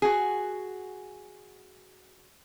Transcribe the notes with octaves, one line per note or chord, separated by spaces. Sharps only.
F#4 G#4